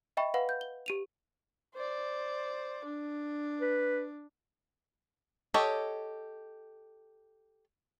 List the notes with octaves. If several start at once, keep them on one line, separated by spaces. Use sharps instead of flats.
D#5 E5 G5 B5 C#6
B4 F5 F#5 B5
G6
G7
G4 D#7 F7
C5 D5
D4
B4
G4 A4 C#5 D#5